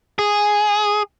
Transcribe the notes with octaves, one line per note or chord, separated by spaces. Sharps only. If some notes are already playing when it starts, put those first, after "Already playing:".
G#4